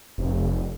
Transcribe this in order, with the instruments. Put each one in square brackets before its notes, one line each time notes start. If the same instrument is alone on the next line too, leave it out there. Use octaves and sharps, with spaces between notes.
[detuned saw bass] F1